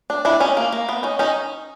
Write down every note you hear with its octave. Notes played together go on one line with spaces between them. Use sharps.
D4
D4 E4
C#4 D#4
A#3
A#3
B3
C#4 D#4
C#4 D#4